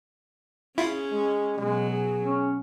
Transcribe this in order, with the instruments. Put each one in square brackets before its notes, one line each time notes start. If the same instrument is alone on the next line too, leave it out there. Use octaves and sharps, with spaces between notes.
[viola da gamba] C#4 G#4 [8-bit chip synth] E4 F4
[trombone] G#3
[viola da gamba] B2 F#3 [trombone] G#3
[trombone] G#4
[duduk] C#4